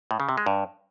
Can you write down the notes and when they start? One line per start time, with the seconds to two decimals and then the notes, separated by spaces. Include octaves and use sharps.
0.11 A2
0.20 C#3
0.29 C3
0.38 G#3
0.46 G2